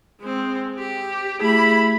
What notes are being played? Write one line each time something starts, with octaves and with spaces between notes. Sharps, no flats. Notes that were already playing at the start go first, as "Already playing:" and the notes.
G#3 C4
G4
A3 E4 G4 G#4 B5